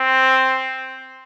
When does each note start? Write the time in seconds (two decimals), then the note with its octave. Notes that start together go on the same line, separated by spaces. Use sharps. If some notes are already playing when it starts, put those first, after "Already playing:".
Already playing: C4